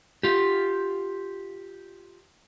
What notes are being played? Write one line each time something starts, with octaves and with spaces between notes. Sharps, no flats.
F4 G4